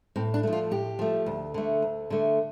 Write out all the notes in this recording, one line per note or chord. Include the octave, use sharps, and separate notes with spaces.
A2 C4
D4
F3 A3
F4
A2 G4
F3 A3
D2
D3 A3
D2
D3 A3